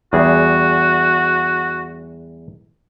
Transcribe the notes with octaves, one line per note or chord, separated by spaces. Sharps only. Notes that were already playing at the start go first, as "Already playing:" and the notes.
E2 G3 F#4 G#4